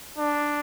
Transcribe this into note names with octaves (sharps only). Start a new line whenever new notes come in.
D4